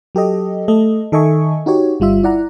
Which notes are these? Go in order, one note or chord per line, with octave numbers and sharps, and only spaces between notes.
F#3 G4 A4 D#5
A3 A4 D#5
D#3 A4 D#5 E5 G#5 C#6
D#4 F#4 G4 C#5
G1 G3 F4 E5
E4 D5 F#5 A#5